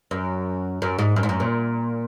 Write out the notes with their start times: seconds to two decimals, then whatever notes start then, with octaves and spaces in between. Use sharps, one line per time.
0.11 F#2
0.82 F#2
0.98 G#2
1.16 F#2
1.23 G#2
1.29 F#2
1.40 A#2